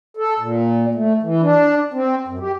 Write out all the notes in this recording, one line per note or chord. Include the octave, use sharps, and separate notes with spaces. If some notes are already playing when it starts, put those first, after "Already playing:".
A4
A#2
A3
E3
D4
C4
F#2
G4